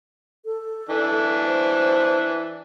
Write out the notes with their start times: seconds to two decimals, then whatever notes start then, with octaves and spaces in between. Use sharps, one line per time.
0.45 A4
0.89 E3 D4
1.46 C5